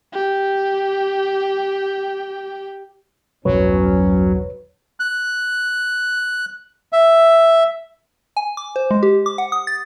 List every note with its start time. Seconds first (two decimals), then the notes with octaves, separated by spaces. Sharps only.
0.12 G4 G5
3.45 E1 B1 G2 F#3 C#4 B4 C#5
5.00 F#6
6.92 E5
8.37 G#5
8.57 D6
8.76 C5
8.91 G#3
9.03 G4
9.26 D6
9.38 F#5
9.52 D#6
9.67 A6